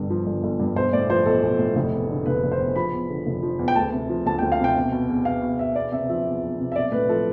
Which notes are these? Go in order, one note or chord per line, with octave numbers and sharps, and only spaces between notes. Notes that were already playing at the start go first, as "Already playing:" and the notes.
Already playing: G1 G2 B2
F3
G1
G1
G2
B1 C5
A2 D5
F3 C5
B1 A4
B1
A2
F1
E2
D3
F1 B4
F1
C5
E2
F3 B5
E2
D3
F1
F3
E2
G5
D2 A5
C3
F3
D2 A5
D2 G5
F5
C3 G5
B2
B2
E2
E2 F5
B2
B2 E5
E2 D5
C3 E5
F3 E5
E2
E2
C3
E5
B1 D5
A2 B4
F3 A4